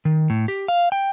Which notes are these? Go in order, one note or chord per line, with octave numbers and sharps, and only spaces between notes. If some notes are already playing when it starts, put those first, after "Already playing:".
D#3
A2
G4
F5
G5